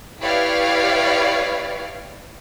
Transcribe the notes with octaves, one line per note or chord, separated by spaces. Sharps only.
E4 G4 B4 C#5 D5 F5